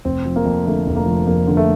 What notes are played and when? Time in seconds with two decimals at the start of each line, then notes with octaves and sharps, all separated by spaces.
0.05 F1 C4
0.25 F3
0.36 A#3
0.45 F2
0.66 D3 A3
0.87 F1
0.96 A#3
1.06 F3
1.27 F2 A#3
1.47 D3
1.57 A3